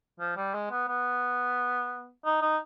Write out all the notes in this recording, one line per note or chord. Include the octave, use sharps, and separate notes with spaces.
F3
G3
G#3
B3
B3
D#4
D#4